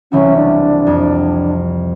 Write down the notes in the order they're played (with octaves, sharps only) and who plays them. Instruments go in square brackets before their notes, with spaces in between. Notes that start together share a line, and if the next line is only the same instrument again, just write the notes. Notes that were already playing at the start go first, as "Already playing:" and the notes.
[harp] C2 E3 F#4 [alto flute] C#4
[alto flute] D4
[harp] F2